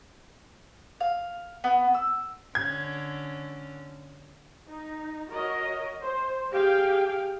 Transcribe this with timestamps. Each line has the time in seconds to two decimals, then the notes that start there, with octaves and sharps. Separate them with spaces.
1.00 F5
1.64 B3
1.94 E6
2.55 D3 C#4 G#6
4.70 D#4
5.30 F#4 A#4 C#5 D#5
6.02 C5
6.52 G4 G#4 F5 G5